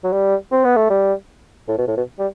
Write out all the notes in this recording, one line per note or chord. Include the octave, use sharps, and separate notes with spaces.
F#3
G3
C4
B3
A3
G3
A2
B2
A2
B2
G3